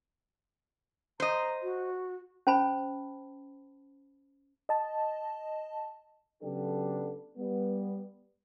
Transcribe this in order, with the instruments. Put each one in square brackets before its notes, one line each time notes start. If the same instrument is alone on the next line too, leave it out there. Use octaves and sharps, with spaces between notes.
[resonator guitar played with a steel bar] C5 D#5 [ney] A#5
[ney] F#4
[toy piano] C#4 C5 A5 B5
[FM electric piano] D#5 A5
[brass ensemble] C#3 F#3 B3 D4 G4 A4
G3 B3